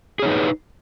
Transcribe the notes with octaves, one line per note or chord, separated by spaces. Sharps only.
D#4 G#4 B4 C#5